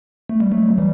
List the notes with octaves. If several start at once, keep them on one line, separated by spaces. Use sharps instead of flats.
A3
G3
F#3 A3
F#3
E3 G3